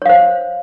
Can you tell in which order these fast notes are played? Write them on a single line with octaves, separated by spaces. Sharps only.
C#5 F5 C5